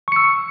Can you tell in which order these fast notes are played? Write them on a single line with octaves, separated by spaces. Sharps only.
C#6 C#7 E6